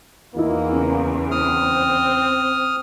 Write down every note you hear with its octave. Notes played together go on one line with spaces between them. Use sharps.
E2 E3 A#3 D#4 E4
C#3
C4 D#6 F6